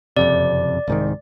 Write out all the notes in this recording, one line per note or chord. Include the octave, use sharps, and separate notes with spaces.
F#1 F2 C3 D5
C2 G#2 D#3